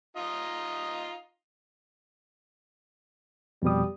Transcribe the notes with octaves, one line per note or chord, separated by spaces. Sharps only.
D#4 F4 D#5
F2 B2 G3 D#6